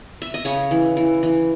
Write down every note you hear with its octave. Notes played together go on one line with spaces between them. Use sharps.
E5
D#5
C#3 C#5
E3
E3
E3